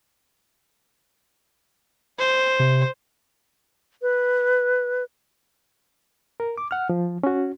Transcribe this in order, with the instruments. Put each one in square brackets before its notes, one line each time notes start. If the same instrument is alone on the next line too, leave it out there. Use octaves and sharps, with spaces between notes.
[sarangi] C5
[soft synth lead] C3
[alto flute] B4
[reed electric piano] A#4
D6
F#5 F6
F3
C#4 F#4